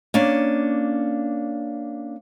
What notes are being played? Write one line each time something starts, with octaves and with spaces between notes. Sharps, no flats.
A#3 C#4 D4